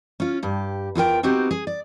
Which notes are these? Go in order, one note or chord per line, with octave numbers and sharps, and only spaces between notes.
C#4 F4
G2 G4
E2 F4 A#4 G5
B3 C4 D#4 F#4 G4
G#4
D5